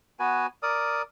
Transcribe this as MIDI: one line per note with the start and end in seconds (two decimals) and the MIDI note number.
0.20 0.47 59
0.20 0.47 66
0.20 0.47 71
0.20 0.47 80
0.63 1.02 70
0.63 1.02 74
0.63 1.02 87